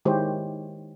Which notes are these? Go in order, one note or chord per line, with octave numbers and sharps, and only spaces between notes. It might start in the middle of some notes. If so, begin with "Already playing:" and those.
D#3 G#3 E4 G4 C5 C#5